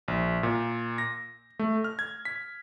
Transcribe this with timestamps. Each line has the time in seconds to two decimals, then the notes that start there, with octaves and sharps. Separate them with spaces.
0.08 A#1
0.43 A#2
0.98 A#6
1.59 A3
1.84 F6
1.99 G#6
2.25 B6